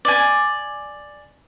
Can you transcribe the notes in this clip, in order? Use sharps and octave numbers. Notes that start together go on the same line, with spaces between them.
D5 G#5